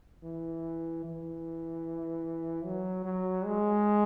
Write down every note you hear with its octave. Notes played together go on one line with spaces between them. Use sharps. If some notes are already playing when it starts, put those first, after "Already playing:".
E3
E3
F#3
F#3
G#3